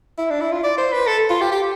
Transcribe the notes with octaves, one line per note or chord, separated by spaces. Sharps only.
E4
D4
E4
F4
D5
C5
B4
A4
F4
G4
G4